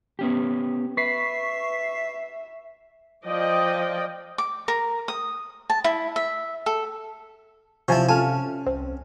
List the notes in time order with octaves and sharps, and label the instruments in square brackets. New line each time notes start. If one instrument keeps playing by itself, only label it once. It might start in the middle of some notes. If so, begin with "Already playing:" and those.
[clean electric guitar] B3 C#4 G4
[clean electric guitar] B4 [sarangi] E5 [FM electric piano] C#6 B6 C7
[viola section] F3 D5 D#5 G5
[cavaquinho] D6
A#4
D#6
A5
E4
E5
A4
[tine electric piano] C3 [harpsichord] F3 E4 [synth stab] C#5 G#5 A5
[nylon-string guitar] C#4 A5 [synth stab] F4 A4 F6 [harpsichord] G#5
[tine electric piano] C2 [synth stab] C4